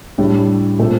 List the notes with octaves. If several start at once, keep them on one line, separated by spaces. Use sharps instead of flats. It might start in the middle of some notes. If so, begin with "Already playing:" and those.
A2 G3 D4 G4
A#2 A3 C4